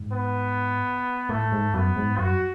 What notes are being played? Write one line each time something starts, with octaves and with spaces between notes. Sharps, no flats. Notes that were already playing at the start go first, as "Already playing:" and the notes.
Already playing: G#2
B3
A2 A3
G#2
F#2 B3
G#2
F#2 F#4